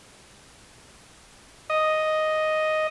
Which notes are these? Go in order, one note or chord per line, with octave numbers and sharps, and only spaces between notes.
D#5